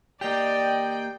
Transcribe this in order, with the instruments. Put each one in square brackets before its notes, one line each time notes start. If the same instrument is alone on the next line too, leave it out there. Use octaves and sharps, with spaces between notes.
[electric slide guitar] A#3 G4 [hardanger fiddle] D5 D#5 [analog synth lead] G5